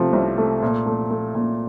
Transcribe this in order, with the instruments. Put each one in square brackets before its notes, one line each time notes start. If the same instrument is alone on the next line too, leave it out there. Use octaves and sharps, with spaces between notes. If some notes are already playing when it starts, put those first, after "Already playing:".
Already playing: [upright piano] C3 F3 A3
C2
A3
A#2
A3
A3
A#2